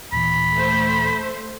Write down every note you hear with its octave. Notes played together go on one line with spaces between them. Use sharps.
D#2 A#2 E3 B5
A3 C5